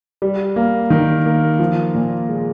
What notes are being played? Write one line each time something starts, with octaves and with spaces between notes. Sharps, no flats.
G3
A#3
D#3
A#3
F3
A#2
G#3